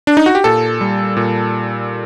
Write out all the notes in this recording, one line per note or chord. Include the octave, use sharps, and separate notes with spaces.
D4
D#4
F#4
G4
A#2 A4
G3
A#2